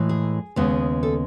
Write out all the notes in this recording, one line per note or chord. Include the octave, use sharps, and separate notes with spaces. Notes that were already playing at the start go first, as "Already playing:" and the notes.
Already playing: A2 E3 G#3
G#4
D#2 C#3 G#3 B3
A4